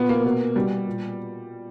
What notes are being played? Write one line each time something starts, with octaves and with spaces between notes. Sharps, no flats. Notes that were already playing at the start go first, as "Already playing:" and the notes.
Already playing: A#2 B3
A#3
B2
B2 G3
A#2